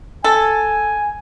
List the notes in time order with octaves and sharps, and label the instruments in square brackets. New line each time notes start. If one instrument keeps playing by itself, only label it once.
[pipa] A4 [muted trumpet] G#5